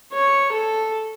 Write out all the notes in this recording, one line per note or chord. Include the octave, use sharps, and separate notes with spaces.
C#5
A4